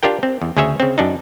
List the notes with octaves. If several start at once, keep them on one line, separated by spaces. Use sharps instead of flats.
D4 F4 G4 A#4 G5
C4
E2
D2 C#3 C#4 G#4 C#5 E5
C#3 C4
F#2 D4 D#4